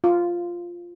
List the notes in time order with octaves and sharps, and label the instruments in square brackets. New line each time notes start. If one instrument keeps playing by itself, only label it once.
[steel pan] F4